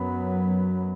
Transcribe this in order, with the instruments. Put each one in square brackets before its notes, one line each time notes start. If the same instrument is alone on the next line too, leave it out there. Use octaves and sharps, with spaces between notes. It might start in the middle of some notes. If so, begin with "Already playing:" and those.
Already playing: [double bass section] F#2 F#3 B3 [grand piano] B5